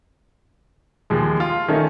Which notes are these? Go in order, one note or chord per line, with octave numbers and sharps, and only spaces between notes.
D#2 F3 G#3
F4
D#3 A3 C#4 D#4 A4